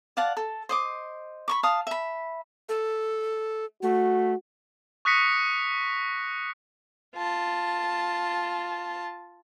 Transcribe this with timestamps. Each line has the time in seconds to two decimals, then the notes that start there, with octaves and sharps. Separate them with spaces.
0.17 D5 F5 F#5 A5
0.37 A4
0.69 C5 D#5 D6
1.48 B5 C#6 D6
1.63 F5 A5 D#6
1.87 E5 B5
2.69 A4
3.82 A3 F#4
5.05 C#6 D#6 F#6 A#6 B6 C#7
7.15 F4 A5